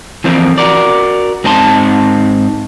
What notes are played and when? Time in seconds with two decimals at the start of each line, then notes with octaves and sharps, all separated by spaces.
0.24 E3 F3 A#3 C4
0.58 F#4 A#4 D5
1.44 G#2 C4 D#4 A5 C6